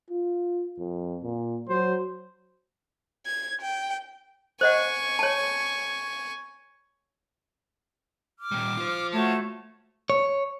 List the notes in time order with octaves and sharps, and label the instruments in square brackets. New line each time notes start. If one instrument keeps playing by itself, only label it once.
[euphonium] F4
F2
A#2
[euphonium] F#3 [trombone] C5
[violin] G#6
G5
[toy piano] C5 D#5 F#5 [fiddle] G#5 C#6
[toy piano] C#5 A5
[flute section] D6 F6
[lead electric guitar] A#2 G3
F4 C5
[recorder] A3 [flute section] F#4 C#5 A5
[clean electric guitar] C#5